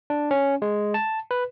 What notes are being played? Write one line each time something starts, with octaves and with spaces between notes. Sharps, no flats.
D4
C#4
G#3
A5
B4